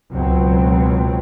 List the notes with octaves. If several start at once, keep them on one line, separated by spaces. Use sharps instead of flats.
C#2 B2 F#3 C4